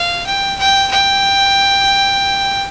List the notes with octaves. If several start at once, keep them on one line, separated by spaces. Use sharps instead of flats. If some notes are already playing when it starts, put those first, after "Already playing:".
Already playing: F5
G5
G5
G5